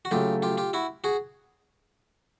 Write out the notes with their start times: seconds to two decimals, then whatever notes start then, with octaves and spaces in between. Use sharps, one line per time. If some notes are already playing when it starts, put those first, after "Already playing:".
0.05 F#4
0.11 C#3 F#3 A3 F4 G4
0.42 F4 G4
0.58 F4 G4
0.73 E4 F#4
1.04 F#4 G#4